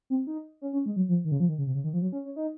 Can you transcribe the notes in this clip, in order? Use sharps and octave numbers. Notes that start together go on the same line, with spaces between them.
C4
D#4
C#4
C#4
G#3
F#3
F3
D#3
C#3
F3
D#3
C#3
C3
C#3
D#3
F3
F#3
C#4
C#4
D#4